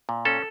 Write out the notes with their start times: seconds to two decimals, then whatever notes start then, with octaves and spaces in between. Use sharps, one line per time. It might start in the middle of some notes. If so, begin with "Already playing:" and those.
0.09 A#2
0.25 C#4 A4